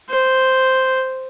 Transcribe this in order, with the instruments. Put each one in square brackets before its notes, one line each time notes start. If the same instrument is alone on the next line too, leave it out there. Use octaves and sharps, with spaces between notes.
[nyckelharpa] C5